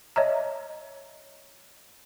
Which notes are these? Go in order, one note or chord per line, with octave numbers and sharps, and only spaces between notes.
C#5 D#5 E5 A#5